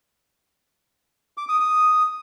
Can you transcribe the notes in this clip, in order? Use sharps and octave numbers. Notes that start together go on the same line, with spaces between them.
D6
D#6
D#6